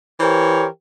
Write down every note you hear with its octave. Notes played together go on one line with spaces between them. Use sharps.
E3 G4 A#4 C5 C#5